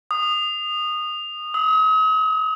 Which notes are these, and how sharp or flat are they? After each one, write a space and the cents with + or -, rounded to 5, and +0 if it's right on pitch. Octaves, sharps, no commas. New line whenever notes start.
D#6 -20
D#6 +45